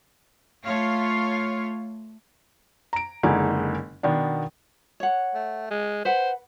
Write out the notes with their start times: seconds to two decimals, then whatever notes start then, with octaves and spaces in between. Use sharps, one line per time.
0.65 A3 F4 C#5 F5
2.93 A#5 D7
3.23 F#1 D3 G#3 D#4 E4 G#5
4.03 B2 D#3 B3 D4
5.00 C#5 F#5
5.35 A3
5.70 G#3
6.05 B4 C5 F#5